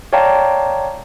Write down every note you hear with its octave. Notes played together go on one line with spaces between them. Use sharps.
C#5 D5 F5 G5 A5 A#5